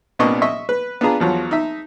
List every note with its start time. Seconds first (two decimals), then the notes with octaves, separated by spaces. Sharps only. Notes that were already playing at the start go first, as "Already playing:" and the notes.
0.19 C2 A#2 B3 D4 D#5 C#6
0.42 D#5 E5 C#6
0.69 B4
1.01 B3 D4 F4 G#4 A#5
1.20 E2 F3 F#3
1.51 D#4 E5